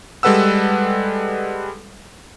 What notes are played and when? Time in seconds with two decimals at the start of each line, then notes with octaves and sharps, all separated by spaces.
0.23 G3 G#3 A4 B4 F#5 E6